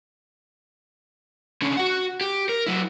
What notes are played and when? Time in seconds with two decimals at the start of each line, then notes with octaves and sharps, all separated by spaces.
1.62 D3 C#4
1.77 F#4 F#5
2.21 G4
2.49 A#4
2.67 F#3 E4